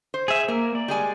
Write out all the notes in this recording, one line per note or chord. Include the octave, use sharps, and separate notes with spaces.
C5
G#4 E5
A#3 A#4
D5
G3 G#3 G#5